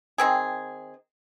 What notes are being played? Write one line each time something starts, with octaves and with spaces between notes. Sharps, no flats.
D#3 C4 G#4